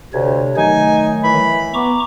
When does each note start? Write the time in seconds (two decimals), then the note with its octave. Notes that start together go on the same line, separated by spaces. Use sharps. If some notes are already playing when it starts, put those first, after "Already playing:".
0.14 D2 C3 C#5
0.57 D#3 F#3 A3 D#4 G#5
1.23 E3 B5
1.74 B3 A#5 C#6 D6